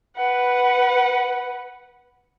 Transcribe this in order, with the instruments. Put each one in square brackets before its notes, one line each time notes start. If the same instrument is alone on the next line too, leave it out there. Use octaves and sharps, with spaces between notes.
[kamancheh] B4 F#5